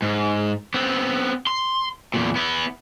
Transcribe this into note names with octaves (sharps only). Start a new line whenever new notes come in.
G#2
B3 C4
C6
E2 A#2
B3 E4